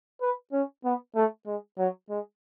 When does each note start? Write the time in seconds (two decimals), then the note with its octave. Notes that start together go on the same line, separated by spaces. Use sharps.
0.21 B4
0.52 C#4
0.84 B3
1.15 A3
1.46 G#3
1.78 F#3
2.10 G#3